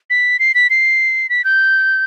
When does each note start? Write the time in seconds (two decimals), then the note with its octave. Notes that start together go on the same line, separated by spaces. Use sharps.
0.10 B6
0.39 C7
0.55 B6
0.70 C7
1.30 B6
1.44 G6